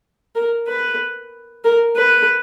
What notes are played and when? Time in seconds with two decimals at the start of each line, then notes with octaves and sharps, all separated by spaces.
0.36 A#4
0.68 B4
1.64 A#4
1.96 B4